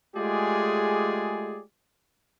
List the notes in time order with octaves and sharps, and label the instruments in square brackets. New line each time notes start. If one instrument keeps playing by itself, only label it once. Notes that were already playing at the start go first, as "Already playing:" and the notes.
[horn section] G#3 A3 F4 G4 G#4 D5